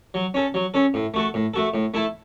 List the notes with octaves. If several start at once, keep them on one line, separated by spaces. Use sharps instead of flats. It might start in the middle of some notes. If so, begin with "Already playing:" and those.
F#3
C#4 A4
F#3
C#4 A4
A2
A3 F#4 A4
A2
A3 F#4 A4
A2
A3 E4 A4